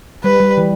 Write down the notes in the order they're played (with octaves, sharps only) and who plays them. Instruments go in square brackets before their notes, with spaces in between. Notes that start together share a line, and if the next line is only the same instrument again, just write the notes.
[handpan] G3 [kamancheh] B4
[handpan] G3
E3